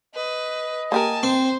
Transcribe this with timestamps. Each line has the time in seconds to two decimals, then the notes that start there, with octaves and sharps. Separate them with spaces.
0.15 B4 D#5
0.92 A#3 G4 A#4 G#5 A5
1.23 C4 C5